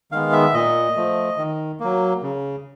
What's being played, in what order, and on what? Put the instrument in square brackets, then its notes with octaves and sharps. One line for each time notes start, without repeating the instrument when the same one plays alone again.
[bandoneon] D#3 G#3 B3 F5
E5
A#2 D#5
F3 A3
D#3
F#3 A#3
C#3